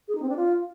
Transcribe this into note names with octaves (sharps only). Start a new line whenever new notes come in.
G#4
D#4
C4
D4
F4